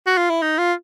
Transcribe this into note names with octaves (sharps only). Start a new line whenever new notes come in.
F#4
F4
E4
D#4
F4